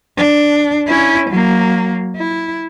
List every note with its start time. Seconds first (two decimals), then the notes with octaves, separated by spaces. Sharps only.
0.17 D4
0.87 C#4 E4
1.29 F#3 A#3
2.16 E4